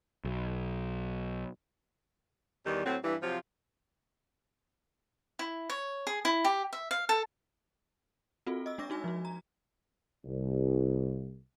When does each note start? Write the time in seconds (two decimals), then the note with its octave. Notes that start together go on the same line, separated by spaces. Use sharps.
0.25 B1
2.65 E2 D#3 G3
2.84 A2 F#3 C4
3.03 G2 E3
3.21 C3 F3 F#3 F4
5.39 E4
5.70 C#5
6.07 G#4
6.25 E4
6.45 G4
6.73 E5
6.91 F5
7.09 A4
8.47 C4 F4 F#4 A4
8.66 D#5 E6
8.78 G#3 D4 D6 E6 A#6
8.90 D#4 F#4 G#5
9.04 F3 F#4
9.25 A#5
10.25 C2